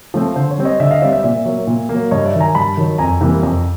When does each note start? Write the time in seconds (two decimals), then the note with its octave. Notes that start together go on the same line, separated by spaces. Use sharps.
0.14 F3 A3 C4
0.36 D3 C5
0.51 C#5
0.58 G3 C4
0.65 C#5 D#5
0.80 D3 D5 E5
0.91 D#5 F5
1.02 G3 C4 D5 E5
1.12 D5 E5
1.23 A#2 D5 E5
1.45 F#3 A#3
1.67 A#2
1.89 F#3 A#3
2.11 G2 C#5 D#5
2.26 D5 E5
2.34 D#3 F#3
2.41 G#5 A#5
2.55 G2 A5 B5
2.77 D#3 F#3
2.98 F2 G#5 A#5
3.21 C3 E3 G3 A#3
3.43 F2